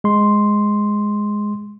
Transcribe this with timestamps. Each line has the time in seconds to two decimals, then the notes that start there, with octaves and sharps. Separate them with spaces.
0.04 G#3 C6